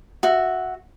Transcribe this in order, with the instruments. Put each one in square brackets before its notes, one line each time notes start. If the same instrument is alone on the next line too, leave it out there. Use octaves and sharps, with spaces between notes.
[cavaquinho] F#4 E5